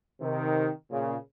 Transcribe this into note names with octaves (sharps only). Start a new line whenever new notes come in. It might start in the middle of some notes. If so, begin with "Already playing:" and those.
C3 D#3
A#2 C#3